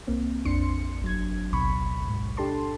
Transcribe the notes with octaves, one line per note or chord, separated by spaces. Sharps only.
C2 A#3 C4
A#1 F2 D4 C6 C#7
G1 F#3 G#6
A1 D2 B2 B5 C#6
A#1 G#2
D4 G4 A4 A5 C6